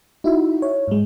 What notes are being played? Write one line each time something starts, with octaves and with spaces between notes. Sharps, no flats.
D#4 E4 F#4 E5
C#5
G#2 G#3